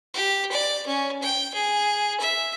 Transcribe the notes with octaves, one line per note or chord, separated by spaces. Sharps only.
G4
D5
C#4
G5
G#4
E5